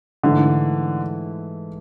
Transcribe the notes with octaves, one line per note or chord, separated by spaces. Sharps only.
G#2 D3 E3 A3